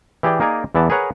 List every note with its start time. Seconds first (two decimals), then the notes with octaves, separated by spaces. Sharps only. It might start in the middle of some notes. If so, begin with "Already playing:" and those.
0.23 E3 G4 G#4 D5 G5
0.40 A#3 D#4 G#4 A#4 D5 G#5
0.75 E2 E3 B3 D5 A5
0.90 G#4 A#4 B4 C#5 F#5 A#5